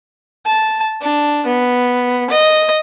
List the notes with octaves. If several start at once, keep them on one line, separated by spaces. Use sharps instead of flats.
A5
D4
B3
D#5